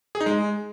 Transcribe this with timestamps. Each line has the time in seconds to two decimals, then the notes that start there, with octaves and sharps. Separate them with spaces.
0.15 G#4
0.21 D#4
0.26 G#3